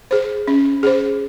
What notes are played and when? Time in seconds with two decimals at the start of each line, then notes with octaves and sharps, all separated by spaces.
0.11 G#4 C5
0.48 C#4
0.83 G#4 C5